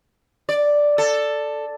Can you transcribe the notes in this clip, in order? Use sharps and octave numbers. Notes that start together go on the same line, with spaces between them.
D5
A4